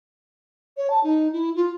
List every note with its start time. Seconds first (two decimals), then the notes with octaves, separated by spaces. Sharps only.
0.77 C#5
0.90 A5
1.03 D#4
1.33 E4
1.56 F4